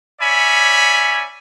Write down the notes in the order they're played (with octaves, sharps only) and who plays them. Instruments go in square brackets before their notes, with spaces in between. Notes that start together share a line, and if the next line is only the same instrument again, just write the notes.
[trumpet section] C#4 C#5 D5 E5 G#5 B5